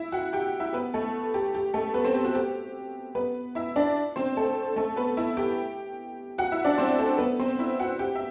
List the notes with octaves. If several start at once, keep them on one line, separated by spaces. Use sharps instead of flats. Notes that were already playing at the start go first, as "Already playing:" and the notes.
Already playing: E4 E5
F#4 F#5
G4 G5
E4 E5
B3 B4
A3 A4
G4
G4
A3 A4
B3 B4
C4 C5
G4
F#4
G4
B3 B4
E4 E5
D4 D5
C4 C5
A3 A4
A3 A4
B3 B4
E4 E5
G4 G5
F#4 F#5
E4 E5
D4 D5
C4 C5
A3 A4
B3 B4
C4 C5
E4 E5
F#4 F#5
G4 G5
E5